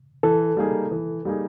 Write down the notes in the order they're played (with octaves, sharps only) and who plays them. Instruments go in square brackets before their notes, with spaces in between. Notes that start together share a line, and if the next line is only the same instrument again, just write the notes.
[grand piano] E3 [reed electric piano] A4
[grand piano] G3 A#3 D#4 G#4
E3
G3 A#3 D#4 G#4